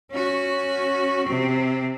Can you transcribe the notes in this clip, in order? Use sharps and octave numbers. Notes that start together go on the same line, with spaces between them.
C#4 F#4
C3 C4